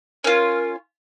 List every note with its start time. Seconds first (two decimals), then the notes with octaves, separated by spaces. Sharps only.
0.24 C#4 F4 A#4